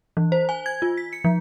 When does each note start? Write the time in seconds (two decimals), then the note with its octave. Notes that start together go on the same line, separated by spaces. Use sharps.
0.17 E3
0.32 C5
0.49 G#5
0.66 G#6
0.82 F4
0.98 B6
1.13 C#7
1.24 F3